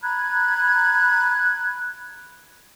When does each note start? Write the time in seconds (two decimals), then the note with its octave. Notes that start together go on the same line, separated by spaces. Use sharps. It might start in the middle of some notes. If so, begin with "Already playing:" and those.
0.02 A#5 B5 F#6 G#6